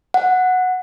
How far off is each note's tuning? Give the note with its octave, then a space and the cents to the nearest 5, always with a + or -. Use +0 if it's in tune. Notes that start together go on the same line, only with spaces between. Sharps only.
F#5 -10